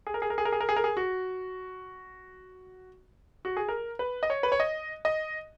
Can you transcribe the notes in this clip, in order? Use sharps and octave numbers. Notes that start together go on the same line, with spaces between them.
G#4
A#4
G#4
A#4
G#4
A#4
G#4
A#4
G#4
A#4
G#4
F#4
F#4
G#4
A#4
B4
D#5
C#5
B4
C#5
D#5
D#5